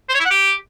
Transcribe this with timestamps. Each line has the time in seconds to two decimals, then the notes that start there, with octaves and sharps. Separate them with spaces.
0.09 C5
0.15 C#5
0.20 E4
0.25 F#5
0.31 G4